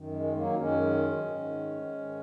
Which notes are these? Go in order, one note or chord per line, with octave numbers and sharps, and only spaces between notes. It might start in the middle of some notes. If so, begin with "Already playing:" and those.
Already playing: F#2 D#3
G#3
F#3 A#3
D#4
F#2 D#3 G#3 C#4
G#2 D#3
G#2 D#3